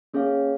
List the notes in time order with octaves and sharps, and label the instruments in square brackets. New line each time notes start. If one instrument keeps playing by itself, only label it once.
[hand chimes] A#3 C#4 G#4 C#5 F5